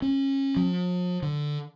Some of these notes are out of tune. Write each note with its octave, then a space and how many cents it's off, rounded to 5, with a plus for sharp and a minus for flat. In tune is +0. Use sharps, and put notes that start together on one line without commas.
C#4 -25
F3 +45
D3 +5